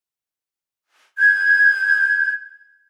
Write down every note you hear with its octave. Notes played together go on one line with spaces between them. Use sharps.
G6 G#6